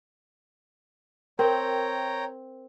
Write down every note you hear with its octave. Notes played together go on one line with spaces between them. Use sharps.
C4 A#4 C#5 G5 A#5